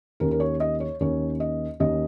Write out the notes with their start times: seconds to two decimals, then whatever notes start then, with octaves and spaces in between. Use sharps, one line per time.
0.20 D#2 D#3 C#4 A#4
0.31 A#4
0.40 C#5
0.60 D#5
0.80 C#5
1.01 D#2 D#3 C#4 C#5
1.40 D#5
1.80 D#2 D#3 C#4 D#5